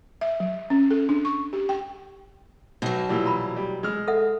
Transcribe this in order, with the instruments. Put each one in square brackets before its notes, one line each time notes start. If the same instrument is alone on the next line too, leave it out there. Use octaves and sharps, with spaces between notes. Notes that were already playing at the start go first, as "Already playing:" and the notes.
[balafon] E5
F#3
C#4
A4
D4
C#6
G4
G5
[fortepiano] B1 [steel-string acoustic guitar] B2 F#3
[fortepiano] A#2 E3 G3
[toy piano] A#5 B5
[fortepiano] G3
G#3 F6
[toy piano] A4 E5 F#5